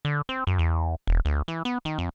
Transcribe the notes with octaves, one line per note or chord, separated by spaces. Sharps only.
D3
C4
F#2
E2
E1
D2
E3
B3
D#3
F2